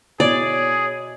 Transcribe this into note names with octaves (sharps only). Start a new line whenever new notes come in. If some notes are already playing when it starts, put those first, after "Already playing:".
B2 E4 G#4 C#5 D5